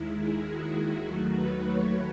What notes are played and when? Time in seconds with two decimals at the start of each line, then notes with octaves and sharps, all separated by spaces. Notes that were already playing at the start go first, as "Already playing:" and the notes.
Already playing: D#2 D#3 G#3 E4
0.19 G#4
0.48 F#4
0.76 E4
1.06 D#2 D#3 F#3 A3 F#4
1.35 B4
1.63 C#5